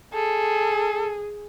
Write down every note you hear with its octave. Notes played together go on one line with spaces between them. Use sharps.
G#4 A4